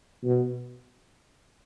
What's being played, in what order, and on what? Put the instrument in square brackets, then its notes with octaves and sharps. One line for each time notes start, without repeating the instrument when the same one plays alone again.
[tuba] B2